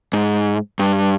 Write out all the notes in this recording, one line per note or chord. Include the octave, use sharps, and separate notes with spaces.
G#2
G2